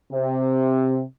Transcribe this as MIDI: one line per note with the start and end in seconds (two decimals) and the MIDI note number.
0.12 1.02 48